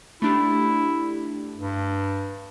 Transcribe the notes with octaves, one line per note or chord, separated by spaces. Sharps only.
A3 D4 E4 G4
G2